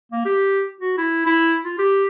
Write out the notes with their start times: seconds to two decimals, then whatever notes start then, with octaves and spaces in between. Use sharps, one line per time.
0.12 A#3
0.25 G4
0.81 F#4
0.97 E4
1.26 E4
1.64 F4
1.78 G4